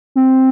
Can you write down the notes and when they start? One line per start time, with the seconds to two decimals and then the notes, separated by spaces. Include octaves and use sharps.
0.16 C4